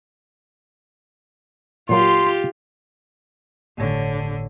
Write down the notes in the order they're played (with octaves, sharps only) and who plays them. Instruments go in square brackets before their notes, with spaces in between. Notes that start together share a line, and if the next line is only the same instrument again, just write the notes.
[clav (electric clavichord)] A#2 F#3 A#3 [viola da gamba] F4 G4 [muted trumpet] C6
[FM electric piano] G1 A2 C#5 [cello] D3